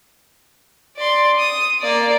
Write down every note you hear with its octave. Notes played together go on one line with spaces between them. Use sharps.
D5 C6
D#6
A#3 D5